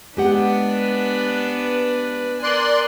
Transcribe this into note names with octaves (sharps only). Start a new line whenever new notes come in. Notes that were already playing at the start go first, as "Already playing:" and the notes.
G#3 B3 D4 G4 B4 F#5
A#4 D5 G#5 C6 F#6